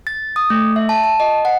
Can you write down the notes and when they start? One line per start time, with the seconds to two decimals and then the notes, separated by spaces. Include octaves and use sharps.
0.07 A6
0.36 D#6
0.50 A3
0.76 E5
0.89 A5
1.04 A5
1.20 D#5
1.45 F#5